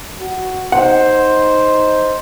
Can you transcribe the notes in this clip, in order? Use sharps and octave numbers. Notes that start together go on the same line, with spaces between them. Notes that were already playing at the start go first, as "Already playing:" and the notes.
F#4
D#4 C5 F#5